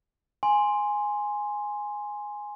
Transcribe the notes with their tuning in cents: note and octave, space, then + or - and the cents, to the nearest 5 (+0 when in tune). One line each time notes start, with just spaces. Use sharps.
G#5 +0 C6 +0